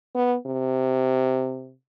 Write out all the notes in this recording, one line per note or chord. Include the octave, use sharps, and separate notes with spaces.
B3
C3